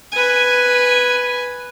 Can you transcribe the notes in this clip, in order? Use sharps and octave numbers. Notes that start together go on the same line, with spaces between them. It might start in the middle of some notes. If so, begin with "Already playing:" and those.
B4 G#5